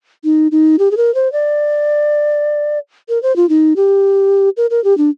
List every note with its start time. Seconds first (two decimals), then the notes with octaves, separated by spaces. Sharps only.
0.24 D#4
0.52 D#4
0.79 G4
0.91 G#4
0.97 A#4
1.15 C5
1.33 D5
3.09 A#4
3.23 C5
3.36 F4
3.49 D#4
3.76 G4
4.57 A#4
4.70 A#4
4.84 G4
4.98 D4